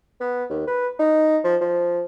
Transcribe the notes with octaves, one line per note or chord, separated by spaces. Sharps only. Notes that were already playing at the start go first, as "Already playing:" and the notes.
B3
D#2
B4
D#4
F3
F3